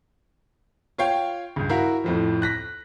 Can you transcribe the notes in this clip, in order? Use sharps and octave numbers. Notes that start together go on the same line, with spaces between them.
F4 C#5 F5 G5
C#2 G2
E4 F#4 A#4 F5
F2 A2 F3
F#6 A#6 B6